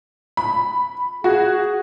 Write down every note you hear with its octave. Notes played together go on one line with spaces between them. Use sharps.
B5
F#4 G#4